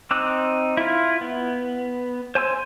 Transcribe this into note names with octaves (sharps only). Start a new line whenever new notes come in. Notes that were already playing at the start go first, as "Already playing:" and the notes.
C4 D#4 D6 E6 F#6
E4 F4
B3
C5 G#5 C6 E6